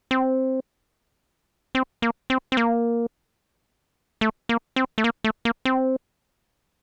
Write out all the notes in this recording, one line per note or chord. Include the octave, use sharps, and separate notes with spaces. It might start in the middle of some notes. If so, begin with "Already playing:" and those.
C4
C4
A#3
C4
C4
A#3
A3
A#3
C4
A3
A#3
A3
A#3
C4